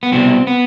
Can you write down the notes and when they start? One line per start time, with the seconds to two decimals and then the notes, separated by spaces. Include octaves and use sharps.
0.03 B3
0.12 C2 B2 G3 C4
0.47 B3